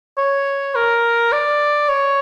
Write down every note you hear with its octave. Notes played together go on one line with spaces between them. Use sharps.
C#5
A#4
D5
C#5